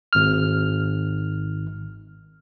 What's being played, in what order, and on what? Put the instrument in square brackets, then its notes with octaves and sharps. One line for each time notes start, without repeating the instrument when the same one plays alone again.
[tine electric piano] G#1 F6